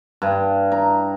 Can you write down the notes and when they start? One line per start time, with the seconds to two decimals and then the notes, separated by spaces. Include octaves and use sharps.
0.22 G2
0.72 A#5